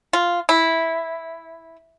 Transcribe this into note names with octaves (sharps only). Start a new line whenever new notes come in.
F4
E4